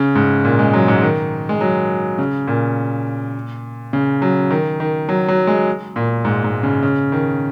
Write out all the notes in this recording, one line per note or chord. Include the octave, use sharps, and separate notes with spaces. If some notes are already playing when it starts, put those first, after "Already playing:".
Already playing: C#3
G#2
A#2
G#3
F#3
G#2
D#3
G#3
F#3
C#3
A#2
C#3
F#3
D#3
D#3
F#3
F#3
G#3
A#2
G#2
G#2
C#3
C#3
D#3